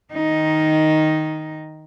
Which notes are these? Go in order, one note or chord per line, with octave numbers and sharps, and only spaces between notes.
D#3 D#4